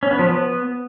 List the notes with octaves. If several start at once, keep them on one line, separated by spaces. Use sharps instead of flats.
C#4
B3
F3
B3